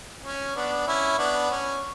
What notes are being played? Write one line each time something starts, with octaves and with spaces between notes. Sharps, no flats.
C#4
B3 D4
C#4 E4
B3 D4
C#4